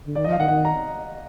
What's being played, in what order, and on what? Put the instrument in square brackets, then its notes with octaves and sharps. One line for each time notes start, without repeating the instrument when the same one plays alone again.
[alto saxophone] D3
[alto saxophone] D#3 [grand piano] D5
[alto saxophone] F3 [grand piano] D#5
[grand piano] F5
[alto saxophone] D#3 [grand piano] F#5
[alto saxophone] D#3 [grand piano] F#5
[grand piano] A#5